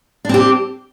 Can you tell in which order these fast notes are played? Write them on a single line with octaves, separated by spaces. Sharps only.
D4 C4 G4